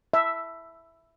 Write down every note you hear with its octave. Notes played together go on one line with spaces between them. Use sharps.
E5